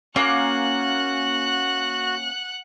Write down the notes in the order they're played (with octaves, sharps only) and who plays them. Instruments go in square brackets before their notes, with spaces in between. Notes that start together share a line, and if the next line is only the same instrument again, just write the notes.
[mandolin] A#3 [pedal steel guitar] C#4 G#5 [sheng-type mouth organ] F#4 [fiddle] F#5 F#6